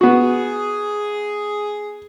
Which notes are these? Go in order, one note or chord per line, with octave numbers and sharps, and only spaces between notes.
B3 F#4 G#4